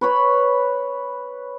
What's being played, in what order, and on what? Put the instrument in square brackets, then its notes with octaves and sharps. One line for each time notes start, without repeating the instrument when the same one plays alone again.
[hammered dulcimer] B4 C#5 B5